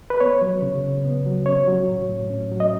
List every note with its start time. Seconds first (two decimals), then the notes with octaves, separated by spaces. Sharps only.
0.10 B4
0.20 B3 C#5
0.42 F#3
0.62 C#3
0.84 C#3
1.05 B3
1.26 F#3
1.46 C#4 C#5
1.68 F#3
1.88 A2
2.09 A2
2.30 C#4
2.52 F#3
2.60 D#5